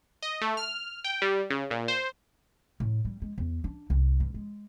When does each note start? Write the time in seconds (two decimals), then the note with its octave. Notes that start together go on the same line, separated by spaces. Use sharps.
0.23 D#5
0.42 A3
0.57 F6
1.04 G5
1.22 G3
1.50 C#3
1.71 A#2
1.88 C5
2.80 A2
3.05 G3
3.22 G#3
3.38 E2
3.64 D4
3.90 C2
4.20 G2
4.34 G#3